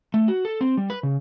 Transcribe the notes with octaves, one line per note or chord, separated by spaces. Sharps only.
A3
F#4
A4
C4
G3
B4
C#3